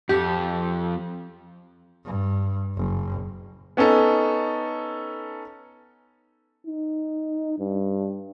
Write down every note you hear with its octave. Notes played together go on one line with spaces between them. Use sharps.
F2 G4
G2
F#1
B3 C#4 D#4 A4
D#4
G2